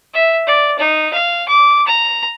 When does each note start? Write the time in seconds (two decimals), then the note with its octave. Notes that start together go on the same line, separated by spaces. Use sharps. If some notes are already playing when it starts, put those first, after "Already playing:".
0.14 E5
0.47 D5
0.79 D#4
1.13 F5
1.48 D6
1.87 A#5